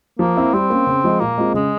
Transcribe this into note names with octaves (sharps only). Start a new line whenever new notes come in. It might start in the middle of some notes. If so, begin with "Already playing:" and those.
F3 A#3
C4 E4
G3 C4
A#3 C#4
C#3
F3 G#3
A#2 A#3
G#3 C4 F4
C#3 G#3